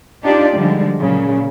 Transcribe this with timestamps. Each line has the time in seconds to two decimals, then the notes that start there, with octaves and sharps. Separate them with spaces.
0.23 D4 D#4 F4 G4 D5
0.56 D3 F3 G3 G#3
0.98 A#2 C#3 F#3